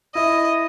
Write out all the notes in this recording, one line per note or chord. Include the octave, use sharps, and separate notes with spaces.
E4 D#5